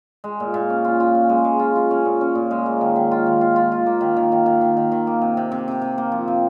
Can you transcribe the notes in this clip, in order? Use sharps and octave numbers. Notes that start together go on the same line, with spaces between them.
G#3
A#2
A#2
C#4
F4
F4
C#4
G#3
G#3
F4
F4
C#4
A#2
C#4
A#2
G#3
A#3
D#3
D#3
F4
D#3
F4
F4
F4
A#3
D#3
D#3
D#3
D#3
D#3
D#3
D#3
A#3
C3
C3
C3
C3
C3
A#3
F3
C3